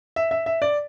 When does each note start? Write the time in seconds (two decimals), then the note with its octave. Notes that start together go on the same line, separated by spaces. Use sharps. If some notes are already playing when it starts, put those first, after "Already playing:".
0.16 E5
0.31 E5
0.46 E5
0.62 D5